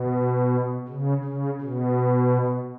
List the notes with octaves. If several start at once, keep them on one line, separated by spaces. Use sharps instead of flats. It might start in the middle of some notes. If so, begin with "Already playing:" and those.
Already playing: B2
C#3
C#3
B2